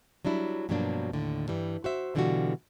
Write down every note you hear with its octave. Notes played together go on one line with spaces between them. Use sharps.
F#3 G3 D4 E4
G2 B2 F3 F#3 A#3 D4
D#2 A2 D3
G2 E3 G3
F#4 C5 E5
B2 D3 E3 G3 F4 F#4